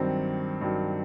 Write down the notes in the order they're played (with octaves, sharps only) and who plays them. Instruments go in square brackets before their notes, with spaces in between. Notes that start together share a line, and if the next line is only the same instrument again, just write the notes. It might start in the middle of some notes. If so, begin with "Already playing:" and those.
Already playing: [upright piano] G2 D#3 F#3 C4
G2 D#3 F#3